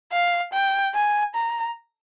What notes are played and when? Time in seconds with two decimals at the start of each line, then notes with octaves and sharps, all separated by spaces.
0.12 F5
0.53 G5
0.94 G#5
1.35 A#5